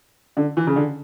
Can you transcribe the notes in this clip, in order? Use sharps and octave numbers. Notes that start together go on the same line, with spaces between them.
D3
E3
C#3
D3